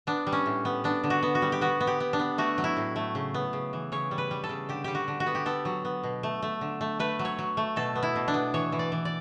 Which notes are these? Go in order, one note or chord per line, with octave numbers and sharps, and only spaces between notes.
B3 D4
G3
C#4
A2
B3
B3 D4
D3
F#4
B3
F#4
G3
G4
B3 F#4
B3
G4
B3
D4
B3
A3 F#4
F#3
E4
A2
A3
C#3
B3
C#3
E3
C#3 C#5
G3
B4
G3
A4
C#3
D3 G4
G3 G4
F#4
D3
F#4
B3
G4
B3 A4
F#3
B3
B2
A3
A3
D3
A3
A3 B4
F#3
C#5
F#3
A3
B2 A4
B3
E4
B2
D4
B3
E3 C#5
E3
D5
E3
D5